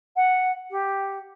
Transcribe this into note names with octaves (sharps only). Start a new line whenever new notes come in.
F#5
G4